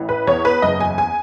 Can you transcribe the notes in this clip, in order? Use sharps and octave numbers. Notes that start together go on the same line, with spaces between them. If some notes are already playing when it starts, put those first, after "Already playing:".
Already playing: A1 E3
B4
E2 C#5
B4
F#1 D#5
G#5
G#5